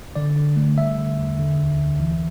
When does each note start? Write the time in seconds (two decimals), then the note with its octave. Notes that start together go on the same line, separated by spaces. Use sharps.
0.15 D3 D5
0.36 D3
0.56 A3
0.77 G3 E5
0.98 D3
1.18 E2
1.39 D3
1.58 D2
1.79 D2
2.00 E3